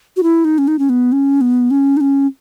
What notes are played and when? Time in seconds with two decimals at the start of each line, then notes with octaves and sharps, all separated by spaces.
0.17 F#4
0.23 E4
0.45 D#4
0.58 C#4
0.68 D#4
0.79 C#4
0.89 B3
1.12 C#4
1.41 B3
1.71 C#4
1.97 D#4
2.01 C#4